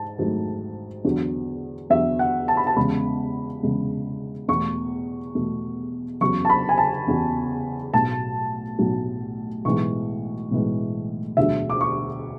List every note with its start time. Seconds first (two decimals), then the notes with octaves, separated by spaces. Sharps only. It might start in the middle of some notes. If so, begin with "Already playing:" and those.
Already playing: G#2 A5
0.19 G#1 G#2 F#3 A3
1.05 E2 D3 F#3
1.90 E2 D3 F#3 E5
2.19 F#5
2.48 A5
2.57 B5
2.67 A5
2.77 E2 C#3 G#3 B5
3.63 E2 C#3 G#3
4.48 E2 B2 A3 C#6
5.35 E2 B2 A3
6.21 F#1 E2 C#3 F#3 C#6
6.45 A5
6.50 B5
6.69 G#5
6.78 A5
7.07 F#1 E2 C#3 F#3
7.93 B1 A2 F#3 A5
8.79 B1 A2 F#3
9.65 B1 A2 E3 G#3 C#6
10.51 B1 A2 E3 G#3
11.37 E1 D2 D3 F#3 E5
11.70 D6
11.81 C#6